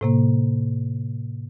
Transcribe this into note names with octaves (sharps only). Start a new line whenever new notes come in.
A2 C3 A#3